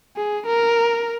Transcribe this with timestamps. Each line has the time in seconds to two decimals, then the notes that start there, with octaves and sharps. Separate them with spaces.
0.16 G#4
0.46 A#4